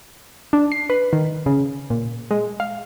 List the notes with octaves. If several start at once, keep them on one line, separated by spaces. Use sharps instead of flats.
D4
C7
B4
D#3
C#3
A#2
G#3
F5